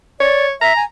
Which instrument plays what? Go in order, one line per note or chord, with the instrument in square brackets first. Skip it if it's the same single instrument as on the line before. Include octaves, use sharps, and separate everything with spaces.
[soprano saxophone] C#5 [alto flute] D5
[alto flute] E5 [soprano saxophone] A#5
[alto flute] G#5